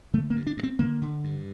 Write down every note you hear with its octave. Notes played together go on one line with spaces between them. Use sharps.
D3 A3
A#3
G2
D4
G2
C4
D3 A#3
D3
G2